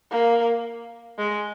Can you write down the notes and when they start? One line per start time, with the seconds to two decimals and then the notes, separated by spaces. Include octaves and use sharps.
0.11 A#3
1.18 G#3